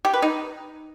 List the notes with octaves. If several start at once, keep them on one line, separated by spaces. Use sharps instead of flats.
G4
B4
D#4